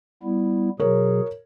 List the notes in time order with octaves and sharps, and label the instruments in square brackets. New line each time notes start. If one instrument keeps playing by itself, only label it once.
[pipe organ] G3 B3 E4
[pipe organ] B2 F#3 G#4 [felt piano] A#4 C#5